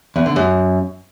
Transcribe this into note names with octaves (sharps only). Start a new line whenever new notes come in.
E2
D3
F#2